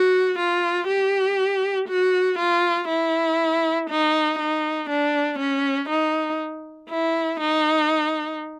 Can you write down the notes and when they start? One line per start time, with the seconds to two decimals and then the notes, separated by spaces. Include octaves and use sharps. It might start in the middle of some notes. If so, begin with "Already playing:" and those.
Already playing: F#4
0.39 F4
0.88 G4
1.89 F#4
2.39 F4
2.89 E4
3.90 D#4
4.39 D#4
4.90 D4
5.39 C#4
5.90 D#4
6.91 E4
7.40 D#4